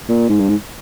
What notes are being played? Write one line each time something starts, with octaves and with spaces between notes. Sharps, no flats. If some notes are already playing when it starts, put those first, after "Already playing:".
A#2
G#2
G2
G#2